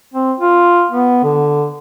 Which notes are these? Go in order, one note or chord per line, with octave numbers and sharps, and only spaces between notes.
C4
F4
B3
D3